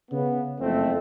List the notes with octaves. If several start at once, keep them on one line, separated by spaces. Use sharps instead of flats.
C#3 B3
F#1 F2 A3 C4